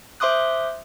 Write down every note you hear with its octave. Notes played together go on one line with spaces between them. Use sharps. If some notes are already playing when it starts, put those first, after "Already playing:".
C5 E5 C6 D6 D#6 F#6